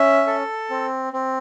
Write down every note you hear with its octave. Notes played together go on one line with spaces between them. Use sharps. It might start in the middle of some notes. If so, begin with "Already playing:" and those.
Already playing: C#4 E5
A4
C4
C4